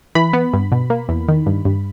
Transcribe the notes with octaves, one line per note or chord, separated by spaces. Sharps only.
E3 B5
B3
G2
B2
A#3
E2
D#3
G2
G2